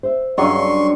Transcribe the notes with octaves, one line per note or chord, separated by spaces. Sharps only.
C5 E5
G2 C#3 F#3 D#5 C6 C#6